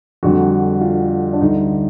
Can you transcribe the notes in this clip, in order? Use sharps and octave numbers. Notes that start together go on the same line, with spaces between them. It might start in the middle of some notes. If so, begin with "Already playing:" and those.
F2 D3 G3 F#4
F4
D4
D2 D3 G3 D#4